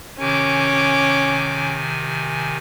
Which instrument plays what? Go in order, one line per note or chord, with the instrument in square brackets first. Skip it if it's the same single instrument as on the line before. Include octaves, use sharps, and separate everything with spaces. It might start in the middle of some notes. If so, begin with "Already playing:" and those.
[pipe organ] C3 D#3 G#5 [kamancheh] C#4 D6